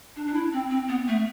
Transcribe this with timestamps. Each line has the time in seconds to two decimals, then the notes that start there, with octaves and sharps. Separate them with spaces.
0.16 D4
0.27 D4
0.34 E4
0.53 C4
0.70 C4
0.89 B3
1.08 A3